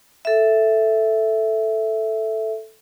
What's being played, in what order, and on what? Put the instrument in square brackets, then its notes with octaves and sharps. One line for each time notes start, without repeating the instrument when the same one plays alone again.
[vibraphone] A4 E5